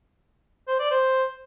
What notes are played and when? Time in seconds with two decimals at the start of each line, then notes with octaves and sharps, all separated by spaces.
0.68 C5
0.79 D5
0.91 C5